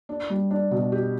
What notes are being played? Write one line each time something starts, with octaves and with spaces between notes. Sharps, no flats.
D4
G3
D4
B2
G4